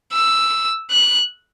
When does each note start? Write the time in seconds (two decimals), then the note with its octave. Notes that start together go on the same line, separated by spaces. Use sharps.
0.13 E6
0.90 F#6